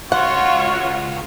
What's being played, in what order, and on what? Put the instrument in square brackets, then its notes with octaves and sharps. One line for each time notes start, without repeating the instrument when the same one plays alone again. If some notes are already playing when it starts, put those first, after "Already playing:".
[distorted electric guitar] C#2 C6 [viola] F4 C#5 [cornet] F#4 [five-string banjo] F#5